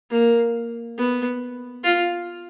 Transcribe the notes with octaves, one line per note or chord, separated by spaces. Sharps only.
A#3
B3
F4